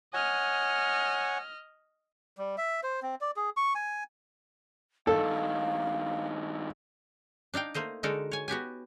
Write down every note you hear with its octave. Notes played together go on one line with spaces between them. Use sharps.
C#5 D#5 F#5 G#5 F6
G3
E5
C5
C4
D5
G#4
C#6
G#5
G2 D#3 A4 F5
D4 D#4 F5 G5
A3 A#3 C5 D#5
D3 G#3 D#4 F#4 A4 A#4
C#5 G#5
B3 F#4 G4 G#5